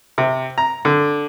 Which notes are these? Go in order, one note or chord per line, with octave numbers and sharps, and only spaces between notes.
C3
A#5
D3